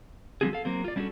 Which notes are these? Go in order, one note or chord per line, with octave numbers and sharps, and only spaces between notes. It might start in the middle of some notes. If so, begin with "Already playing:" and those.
D3 F3 G3 C4 F#4 G#4
A4 F5
F#3 A#3 C4
F4 D5
G3 C#4 D4 F4 F#4 A4